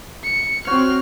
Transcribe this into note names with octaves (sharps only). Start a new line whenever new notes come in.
C#7
C4 F#4 C5 C#5 F6